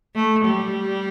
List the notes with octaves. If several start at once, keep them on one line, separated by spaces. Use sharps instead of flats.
A3
G3